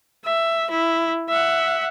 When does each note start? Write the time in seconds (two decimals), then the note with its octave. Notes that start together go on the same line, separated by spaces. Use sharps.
0.25 E5
0.70 E4
1.29 E5 F#5